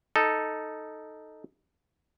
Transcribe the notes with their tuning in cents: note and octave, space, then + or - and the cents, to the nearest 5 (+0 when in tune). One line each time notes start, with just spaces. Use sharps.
D#4 +0 A4 +0